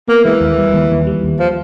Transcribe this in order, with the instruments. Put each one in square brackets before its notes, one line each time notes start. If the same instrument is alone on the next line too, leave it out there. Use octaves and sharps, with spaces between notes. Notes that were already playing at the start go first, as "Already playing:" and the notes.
[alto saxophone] A#3 [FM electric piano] B3
[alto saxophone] E3 [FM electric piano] G#3
[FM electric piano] D#2
G3
D#2
D#2
G3
D#2
[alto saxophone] F3